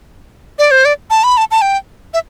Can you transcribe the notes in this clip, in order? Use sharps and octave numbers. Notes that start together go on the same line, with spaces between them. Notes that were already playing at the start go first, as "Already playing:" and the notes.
D5
C5
D5
A5
B5
A5
A5
G5
E5